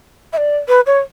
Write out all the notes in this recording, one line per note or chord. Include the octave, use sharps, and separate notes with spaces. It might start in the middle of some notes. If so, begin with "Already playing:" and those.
E5
D5
B4
C#5